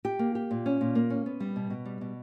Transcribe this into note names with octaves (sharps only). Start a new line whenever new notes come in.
G4
A#3
G4
A#2
C#4
A#2
A#3
C#4
B3
G3
B2
B2
G3
B2